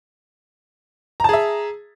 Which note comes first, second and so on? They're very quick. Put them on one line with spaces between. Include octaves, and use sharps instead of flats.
A#5 A5 G#4 E5